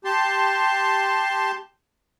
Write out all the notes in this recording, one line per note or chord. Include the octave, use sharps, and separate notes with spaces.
G4 A5 C6